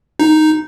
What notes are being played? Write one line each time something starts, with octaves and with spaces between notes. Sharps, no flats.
D#4